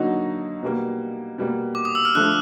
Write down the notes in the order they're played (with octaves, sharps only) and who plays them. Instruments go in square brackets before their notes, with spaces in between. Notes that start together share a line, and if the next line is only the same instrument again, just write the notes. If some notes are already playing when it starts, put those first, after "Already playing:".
Already playing: [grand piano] D3 F#3 A#3 D#4 F#4
B2 G3 A#3
B2 G3 A#3
[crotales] D6
D#6
E6
F6
[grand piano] D3 F3 A3 [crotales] F#6